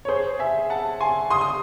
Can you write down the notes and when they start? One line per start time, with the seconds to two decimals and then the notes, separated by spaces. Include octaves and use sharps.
0.05 C#5
0.08 G#4 C5
0.39 E5 G#5
0.70 F#5 A5
1.00 G#5 C6
1.30 C6 D#6
1.41 D#6